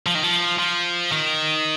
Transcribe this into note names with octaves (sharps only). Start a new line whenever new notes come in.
F3
D#3
F3
F3
D#3